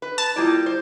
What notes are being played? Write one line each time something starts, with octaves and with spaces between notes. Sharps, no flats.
B4
A5
G3 A#3 E4 F4 D5 D#6
C5